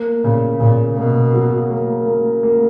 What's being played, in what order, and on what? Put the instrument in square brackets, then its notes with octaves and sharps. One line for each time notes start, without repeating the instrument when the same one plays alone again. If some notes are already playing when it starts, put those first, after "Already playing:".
Already playing: [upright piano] A#3
[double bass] A#2 [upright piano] C#3
[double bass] A#2 [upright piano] C#3
[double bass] B2 [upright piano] A#3
[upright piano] F#3
A#3
A#3
A#3